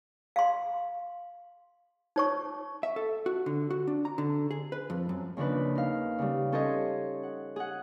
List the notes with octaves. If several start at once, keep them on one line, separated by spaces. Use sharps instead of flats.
F5 C6
D#4 C#5 C#6
E5
A4
F#4
D3
F#4
D4
A#5
D3
G#4
B4
F2
F#2
D#2 C#3 F3 D4 B4
D#4 F5
C#3 G3
C#4 A4 C5 C#5 D#5
F#5
G#4 F#5